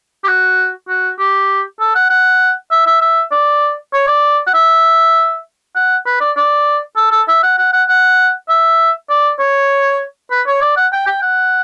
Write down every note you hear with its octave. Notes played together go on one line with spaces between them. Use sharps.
G4
F#4
F#4
G4
A4
F#5
F#5
E5
E5
E5
D5
C#5
D5
F#5
E5
F#5
B4
D5
D5
A4
A4
E5
F#5
F#5
F#5
F#5
E5
D5
C#5
B4
C#5
D5
F#5
G5
G5
F#5